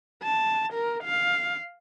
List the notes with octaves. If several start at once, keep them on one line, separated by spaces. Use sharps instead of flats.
A5
A#4
F5